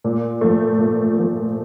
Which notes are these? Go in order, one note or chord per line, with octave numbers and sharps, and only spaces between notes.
A#2
F3 A3
A#2
F3 A3